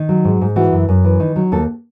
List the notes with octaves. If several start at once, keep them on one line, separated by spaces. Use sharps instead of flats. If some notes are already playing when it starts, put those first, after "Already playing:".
Already playing: D#3
F#3
G#2
G#2
E3 F#4
F#2
F#2
E3
D#3
F#3
D#2 A4